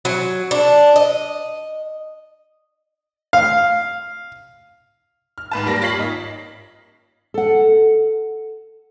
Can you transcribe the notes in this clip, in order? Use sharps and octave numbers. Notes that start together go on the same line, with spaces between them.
F#3
D4
D#5
F5
F6
G#2 B4 A5
G3 A#3 B5 A#6
F4 C#5 B6 C7 F#7
G#1 D#4
A4 F#5